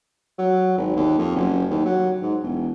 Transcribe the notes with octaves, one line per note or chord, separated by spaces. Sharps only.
F#3
G#1
D#2
F2
F#1
D#2
F#3
G#2
E1